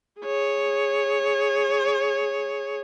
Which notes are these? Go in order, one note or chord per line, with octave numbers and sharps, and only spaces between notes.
G#4 C#5